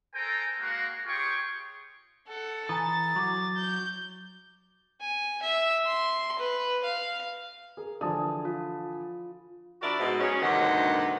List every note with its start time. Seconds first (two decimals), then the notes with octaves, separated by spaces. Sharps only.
0.14 A4 A#4 C5 G5 G#5 A#5
0.60 G#3 A#3 F#4 A#4 F5 F#5
1.06 F4 G4 G#4 C#5 G5 C#6
2.28 A4 F#5
2.69 E3 G#5 A#5 D#6 A6
3.16 F#3 C#6 D6
3.57 G6
5.01 G#5
5.43 E5
5.87 C6
6.39 B4
6.84 F5
7.77 G#4 A#4
8.01 D3 E3 F3 D5 G#5 A5 D#6
8.45 F4
9.82 F3 D4 E4 F#4 A#4 D5
9.99 G#2 B2
10.21 F#3 C#4 G#4
10.42 D2 G2 C3 D#3 G4 F#5